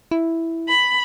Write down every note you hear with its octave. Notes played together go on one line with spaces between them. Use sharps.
E4
B5